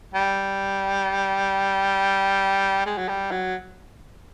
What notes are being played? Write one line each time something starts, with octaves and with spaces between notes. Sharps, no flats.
G3
G#3
F#3
G3
F#3